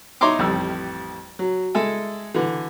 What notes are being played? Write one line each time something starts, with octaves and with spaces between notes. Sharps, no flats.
D#4 E4 C#5 A#5 C6 D6
A1 F2 G3 E6
F#3
G#3 E4 A4 G#5
D3 E3